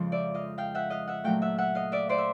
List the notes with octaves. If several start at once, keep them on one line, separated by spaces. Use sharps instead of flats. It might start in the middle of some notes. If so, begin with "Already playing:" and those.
Already playing: F2 C#3 F3 G#3
D5 E5
D#5 F5
F5 G5
E5 F#5
D#5 F5
E5 F#5
A#2 F#3 A3 F5 G5
E5 F#5
E5 F#5
D#5 F5
D5 E5
C5 D5
E5